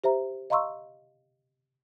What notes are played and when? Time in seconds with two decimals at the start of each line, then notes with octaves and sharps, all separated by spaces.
0.04 G4 C5 E5 A#5
0.50 D#5 F5 A#5 C6 C#6 E6